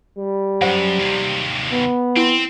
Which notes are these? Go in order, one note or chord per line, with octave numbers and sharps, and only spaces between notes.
G3
F#2 C5 F#5
D#2 C3
B3
C4 E4 C6